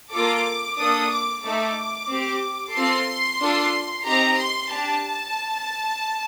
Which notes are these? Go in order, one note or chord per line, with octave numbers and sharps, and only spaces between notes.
A#3 F4 A4 D6
A#3 D4 A4 D#6
D6
A3 D#4 A4 D6
C4 G4
C4 F4 A4 C6
D4 F4 A4
C4 D#4 G4 A#5
C6
D4 G4 A5